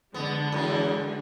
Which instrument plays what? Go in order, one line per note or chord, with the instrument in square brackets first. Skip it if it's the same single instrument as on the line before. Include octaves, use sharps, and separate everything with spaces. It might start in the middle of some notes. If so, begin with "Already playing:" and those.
[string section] D3 G#3 [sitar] B3
[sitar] F#2 E3